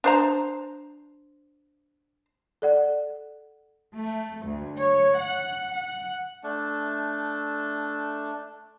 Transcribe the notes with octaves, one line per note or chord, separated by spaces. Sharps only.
D4 C5 A#5
A4 D5 F#5
A3
D2
C#5
F#5
F#5
A3 D4